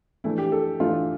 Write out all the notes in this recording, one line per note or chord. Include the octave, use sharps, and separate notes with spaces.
E3 A3 D4 E4
G4
A4
E3 A3 D4 F4